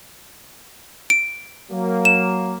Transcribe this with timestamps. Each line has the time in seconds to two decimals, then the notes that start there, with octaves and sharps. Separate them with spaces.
1.10 D7
1.71 F#3 A#3
2.05 E7